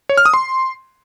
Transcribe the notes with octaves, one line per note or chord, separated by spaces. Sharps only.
C#5
F6
D#6
C6